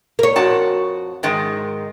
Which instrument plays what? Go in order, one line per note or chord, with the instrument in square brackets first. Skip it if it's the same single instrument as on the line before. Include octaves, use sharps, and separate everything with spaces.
[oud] A#4 C#5
[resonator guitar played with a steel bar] F2 F#4 A5
G#2 D#3 G#3